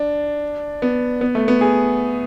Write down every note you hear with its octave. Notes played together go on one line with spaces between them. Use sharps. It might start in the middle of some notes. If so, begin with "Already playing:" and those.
Already playing: D4
B3
B3
A3
B3
G#4